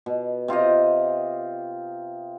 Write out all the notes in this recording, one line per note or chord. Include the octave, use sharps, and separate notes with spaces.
B2
C3 F4 G4 D#5